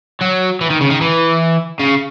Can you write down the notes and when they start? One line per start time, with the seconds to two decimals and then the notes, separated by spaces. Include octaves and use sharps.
0.22 F#3
0.61 E3
0.70 D#3
0.81 C#3
0.90 D#3
1.01 E3
1.79 C#3